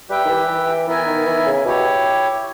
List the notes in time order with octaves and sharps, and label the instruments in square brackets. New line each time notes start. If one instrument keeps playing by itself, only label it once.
[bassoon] G3 [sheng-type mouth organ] G4 B4 E5 G5
[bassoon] D#3
E3
E3
[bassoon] E3 [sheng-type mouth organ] B3 E4 A#4 E5 G#5
[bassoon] D#3
E3
C#3
[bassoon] B2 [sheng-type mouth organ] E4 G4 C#5